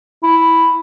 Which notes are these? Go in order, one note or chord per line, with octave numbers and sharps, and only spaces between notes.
E4